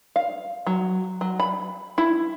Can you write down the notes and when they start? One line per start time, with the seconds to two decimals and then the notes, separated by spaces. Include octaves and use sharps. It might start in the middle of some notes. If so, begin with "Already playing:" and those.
0.16 F5
0.67 F#3
1.21 F#3
1.40 B5
1.98 E4